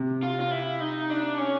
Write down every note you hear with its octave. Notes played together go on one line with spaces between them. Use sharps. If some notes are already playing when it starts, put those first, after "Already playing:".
Already playing: C3
F4
F4
E4
D#4
D4
C#4